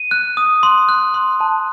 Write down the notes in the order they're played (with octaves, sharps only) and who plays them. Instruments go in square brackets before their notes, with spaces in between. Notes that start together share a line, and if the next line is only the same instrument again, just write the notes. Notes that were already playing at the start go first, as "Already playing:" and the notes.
Already playing: [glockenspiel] D#7
F#6
D#6
C6
F#6
C6
A5